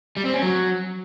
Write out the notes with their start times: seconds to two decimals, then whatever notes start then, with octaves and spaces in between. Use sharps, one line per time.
0.17 G3
0.25 C4
0.34 C#4
0.43 F#3